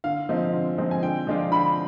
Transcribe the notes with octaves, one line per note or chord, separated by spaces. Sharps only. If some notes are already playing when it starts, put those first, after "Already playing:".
D3 F5
F3 G#3 C4 D#4
D3
F3 G#3 C4 D#4
G#5
D3 G5
F3 G#3 D4 F4
D3 B5